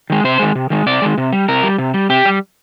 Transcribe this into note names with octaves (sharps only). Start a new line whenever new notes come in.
D#3 G#3
C3 C5
D#3 G#3
C3
D#3 G#3
C3 D5
D#3 G#3
C3
G3
C3 A#4
G3
C3
G3
C3 G4
G3